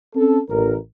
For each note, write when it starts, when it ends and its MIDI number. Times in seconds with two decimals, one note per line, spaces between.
0.15 0.39 60
0.15 0.39 61
0.15 0.39 69
0.50 0.75 33
0.50 0.75 70